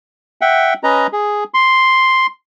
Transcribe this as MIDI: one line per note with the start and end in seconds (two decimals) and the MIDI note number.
0.41 0.74 76
0.41 0.74 78
0.41 0.74 79
0.83 1.07 61
0.83 1.07 71
0.83 1.07 75
0.83 1.07 82
1.12 1.44 68
1.54 2.27 84